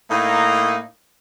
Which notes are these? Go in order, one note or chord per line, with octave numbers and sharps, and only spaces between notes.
A2 A#3 D#4